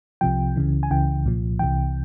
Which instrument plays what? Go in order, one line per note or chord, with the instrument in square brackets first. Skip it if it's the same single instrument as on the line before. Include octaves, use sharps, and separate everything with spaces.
[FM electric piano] C2 C3 F3 G5
C#2 C#3 E3
G#5
C#2 C#3 E3 G5
C2 A#2 F3
C2 C3 E3 G5